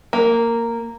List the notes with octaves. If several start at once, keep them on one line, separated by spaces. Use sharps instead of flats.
A#3